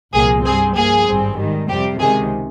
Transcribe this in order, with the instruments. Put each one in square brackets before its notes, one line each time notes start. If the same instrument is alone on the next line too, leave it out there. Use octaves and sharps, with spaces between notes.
[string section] C2 A#2 F3 A#3 G#4
G2 G3 C4 G#4
G2 F3 A#3 G#4
G#1 G2 G3 C4
G#2 D#3 G3
F2 C3 G3 C4 G4
C#2 C3 D#3 G#3 G#4